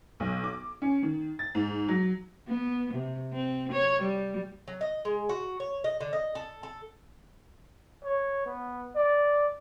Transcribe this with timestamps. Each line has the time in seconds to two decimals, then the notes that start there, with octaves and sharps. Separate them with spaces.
0.20 B1
0.44 D6
0.82 C#4
1.03 D#3
1.39 A6
1.55 G#2
1.88 F#3
2.48 B3
2.94 C3
3.33 C4
3.72 C#5
4.02 G3
4.68 F#3
4.81 D#5
5.05 G#3
5.29 F#4
5.60 C#5
5.84 D#5
6.01 D3
6.13 D#5
6.35 A4
6.63 A4
8.04 C#5
8.46 B3
8.96 D5